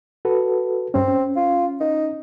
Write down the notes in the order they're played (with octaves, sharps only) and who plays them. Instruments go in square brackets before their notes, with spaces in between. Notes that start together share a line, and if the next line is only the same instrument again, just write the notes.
[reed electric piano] F#4 A4 B4
[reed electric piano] G2 C#4 [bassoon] C4
[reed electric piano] C#4
[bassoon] F4
D#4